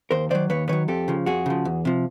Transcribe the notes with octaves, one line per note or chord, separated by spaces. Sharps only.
D#2 A#4 C5
D#3 F#3 C5 D5
D#2 B4 C#5
D#3 F#3 B4 C#5
F2 G4 A4
C#3 F3
F2 F#4 G#4
C#3 F3
E2
C3 F3